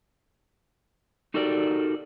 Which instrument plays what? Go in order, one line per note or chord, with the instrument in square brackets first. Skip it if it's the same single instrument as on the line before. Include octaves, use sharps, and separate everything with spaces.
[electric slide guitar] D#4 F#4 G4 A4 A#4 D5